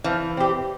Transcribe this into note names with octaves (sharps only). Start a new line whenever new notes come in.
E3 F3
C4 G4